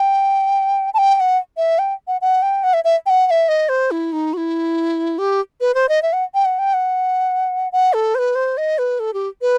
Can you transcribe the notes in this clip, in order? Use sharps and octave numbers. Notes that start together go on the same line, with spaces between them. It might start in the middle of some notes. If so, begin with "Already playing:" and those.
Already playing: G5
A5
G5
G5
F#5
E5
G5
F#5
F#5
G5
F#5
E5
E5
G5
F#5
F#5
E5
D#5
C5
E4
D#4
F#4
E4
G4
B4
C5
D#5
E5
F#5
G5
F#5
G5
F#5
F#5
A4
C5
B4
C5
D#5
B4
A4
G4
B4